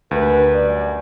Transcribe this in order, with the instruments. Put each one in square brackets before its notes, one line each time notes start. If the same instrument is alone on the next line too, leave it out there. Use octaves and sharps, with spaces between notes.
[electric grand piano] D2 [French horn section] G4 A#4 B4
[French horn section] F#2 G3 D5